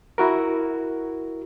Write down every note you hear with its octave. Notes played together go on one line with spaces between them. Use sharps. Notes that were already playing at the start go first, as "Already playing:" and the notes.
E4 F#4 A#4